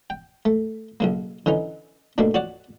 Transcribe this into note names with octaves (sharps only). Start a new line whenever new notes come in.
G5
A3
B1 C#3 A#3
D3 E3 C#4 D#4
B2 A3 A#3 D4
F#4 C#5 D5 F#5